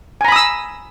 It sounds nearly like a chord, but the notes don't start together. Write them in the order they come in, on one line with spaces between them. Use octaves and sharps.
G#5 A#5 B5 D#6 E6